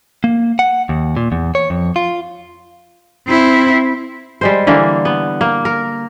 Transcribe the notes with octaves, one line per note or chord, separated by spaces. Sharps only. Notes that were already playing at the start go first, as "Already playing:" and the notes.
A#3
F#5
D#2
A#2
E2
C#5
F2
F4
C4 E4
G3 G#3 C5
D3 E3 A#3
B3
A#3
A#4